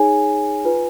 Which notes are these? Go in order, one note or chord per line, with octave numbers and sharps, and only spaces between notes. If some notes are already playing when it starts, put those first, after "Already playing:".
Already playing: D#4 G#4 C#5 G#5
F4 B4